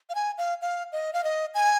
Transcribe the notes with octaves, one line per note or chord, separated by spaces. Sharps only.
F5
G#5
F5
F5
D#5
F5
D#5
G#5